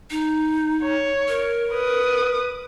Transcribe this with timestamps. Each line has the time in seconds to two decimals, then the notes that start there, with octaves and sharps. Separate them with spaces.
0.11 D#4
0.82 C#5
1.28 A#4
1.72 B4 D#6